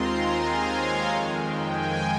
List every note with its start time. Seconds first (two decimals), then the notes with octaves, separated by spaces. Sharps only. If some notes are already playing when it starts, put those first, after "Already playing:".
Already playing: D#2 D#3 G#3 C4 F4 A#5 C6
0.13 G#5
0.45 F5
0.76 C#5
1.07 F2 D#3 G#3
1.38 G5
1.69 G#5